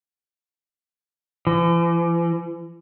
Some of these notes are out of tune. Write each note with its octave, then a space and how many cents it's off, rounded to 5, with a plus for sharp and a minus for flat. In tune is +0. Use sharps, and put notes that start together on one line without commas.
E3 +45